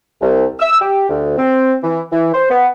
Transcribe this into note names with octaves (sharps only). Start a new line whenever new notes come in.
C2
E6
G4
D2
C4
E3
E3
C5
B3